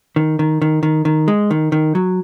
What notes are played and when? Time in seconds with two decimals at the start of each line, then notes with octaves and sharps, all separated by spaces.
0.16 D#3
0.39 D#3
0.62 D#3
0.83 D#3
1.05 D#3
1.28 G#3
1.51 D#3
1.72 D#3
1.95 F#3